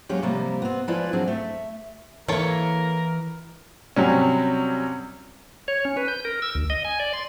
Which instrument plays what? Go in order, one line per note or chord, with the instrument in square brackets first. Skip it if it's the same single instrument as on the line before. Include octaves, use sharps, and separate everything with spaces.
[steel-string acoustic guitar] F#3 G#3 A#3 C#4 G4
C3 F3 G3 A#3
B3 C4
F3 G#3 E4 F4 B4 D5
F3 F#3 C4 D4 G#4
A3 E5
[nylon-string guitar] E3 E4 [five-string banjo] A#3 A4 C#5 [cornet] A#4
[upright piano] C3 F#3 G3 C#4
[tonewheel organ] C#5
C#4
B4
G6
A#4
E6
D2
D#5
G#5
D5
C6